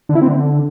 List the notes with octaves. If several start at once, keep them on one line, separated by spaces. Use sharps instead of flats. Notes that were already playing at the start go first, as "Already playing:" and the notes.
D3
E4
C4
D3